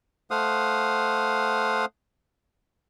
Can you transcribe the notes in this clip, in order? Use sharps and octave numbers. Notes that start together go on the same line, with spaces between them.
A3 C5 F5 F#5 D#6